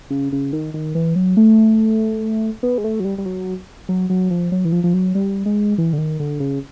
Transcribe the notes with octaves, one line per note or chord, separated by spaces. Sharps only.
C#3
C#3
D#3
D#3
E3
F#3
A3
B3
G#3
A3
F#3
G3
G3
F#3
F#3
F#3
F3
F#3
E3
F3
F3
F#3
G3
G#3
E3
D3
D#3
D3
C#3